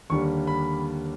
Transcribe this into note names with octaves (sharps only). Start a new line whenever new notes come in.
D#2 D3 G3 A#3 C#6
B5